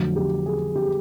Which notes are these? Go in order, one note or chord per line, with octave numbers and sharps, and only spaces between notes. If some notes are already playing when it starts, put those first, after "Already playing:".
Already playing: F2 D3 F#3 A3
G4
G#4
G4